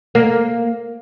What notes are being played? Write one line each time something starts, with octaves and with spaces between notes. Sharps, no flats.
A#3